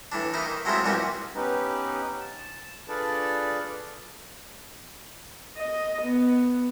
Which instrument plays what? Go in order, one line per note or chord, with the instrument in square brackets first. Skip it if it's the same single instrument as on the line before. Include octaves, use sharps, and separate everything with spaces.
[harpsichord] A2 E3 D4
A#3 D#4 E4
D#3
F#3 G#3 A3 C4 E4 F4
C2 A#2 E3 C#4 F#4 G4
[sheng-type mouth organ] B3 C#4 D#4 G4 B4
A5
D4 F4 G#4 A4 B4 D5
[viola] D#5
B3